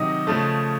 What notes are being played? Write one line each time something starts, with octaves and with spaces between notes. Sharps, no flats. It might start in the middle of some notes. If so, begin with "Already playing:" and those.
Already playing: C3 D#3 F#3 D#5
C#3 F3 A3